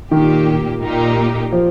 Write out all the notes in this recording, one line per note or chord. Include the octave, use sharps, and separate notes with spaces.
A#2 D#3 A#3 G4
A#2 A#3 D#4 G4
F3